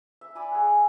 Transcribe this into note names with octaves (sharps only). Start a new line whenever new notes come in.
E5
D5 E5 G#5 B5
G#4 F#5